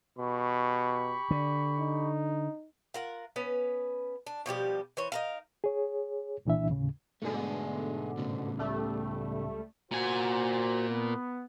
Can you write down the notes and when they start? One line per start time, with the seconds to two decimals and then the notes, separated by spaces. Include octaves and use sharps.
0.18 B2 G4 B5 C#6
1.31 D3
1.79 D#4
2.94 F4 A#4 F#5
3.36 B3 C#4 B4
4.27 D4
4.46 B2 F3 G3 G4
4.97 E3 C5 C#5
5.12 D#4 A#4 F5
5.64 G#4 C#5
6.45 C2 A#2 E3 D4 E5
6.70 D#2 A2 C#3
7.22 G#2 B2 D3 A3 G#4
8.18 A2 C#3
8.58 C#2 G3 A3
9.91 A#2 F#4 C5 G#5
10.89 B3